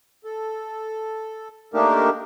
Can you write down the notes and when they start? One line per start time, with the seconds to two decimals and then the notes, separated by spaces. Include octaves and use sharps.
0.25 A4
1.74 A3 A#3 D4 D#4 G4 A#4